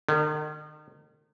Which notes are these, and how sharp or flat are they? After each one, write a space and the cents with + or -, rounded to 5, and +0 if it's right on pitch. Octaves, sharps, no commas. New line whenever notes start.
D#3 -40